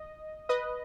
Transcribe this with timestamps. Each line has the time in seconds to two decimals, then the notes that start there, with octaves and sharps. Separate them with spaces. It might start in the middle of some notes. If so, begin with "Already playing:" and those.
Already playing: D#5
0.49 B4 D#5